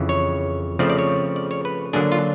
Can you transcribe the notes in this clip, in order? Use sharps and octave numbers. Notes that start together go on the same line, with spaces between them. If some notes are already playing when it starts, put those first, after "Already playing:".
Already playing: F2 C#3 E3
C#5
C#3 F3 A3 C4 D5
D5
C#5
D5
C#5
B4
D3 F#3 A#3 D4 G#4
F4